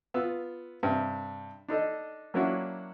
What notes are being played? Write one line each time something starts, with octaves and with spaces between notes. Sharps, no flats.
B3 F4 E6
G2 C3
D4 D#4 A4 D#5
F#3 A#3 C#4 D4 E4 F#4